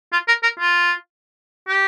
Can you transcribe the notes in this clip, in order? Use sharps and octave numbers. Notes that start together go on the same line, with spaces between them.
F4
A#4
A#4
F4
G4